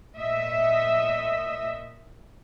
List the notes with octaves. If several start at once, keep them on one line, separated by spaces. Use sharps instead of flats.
A#2 D#5 E5